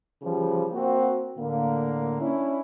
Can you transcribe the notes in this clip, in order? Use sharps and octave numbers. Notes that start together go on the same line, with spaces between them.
C#3 E3 F3 G3
A#3 C4 F#4
A2 D3 A#3
C#4 D4 E4